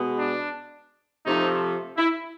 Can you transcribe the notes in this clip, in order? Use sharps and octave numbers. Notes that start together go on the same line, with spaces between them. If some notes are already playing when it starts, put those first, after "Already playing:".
Already playing: B2 G#3 B3
D4
C3 F3 A3 D#4
E4